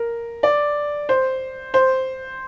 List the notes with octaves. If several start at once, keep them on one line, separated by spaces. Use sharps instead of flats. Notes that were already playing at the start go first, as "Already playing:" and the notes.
Already playing: A#4
D5
C5
C5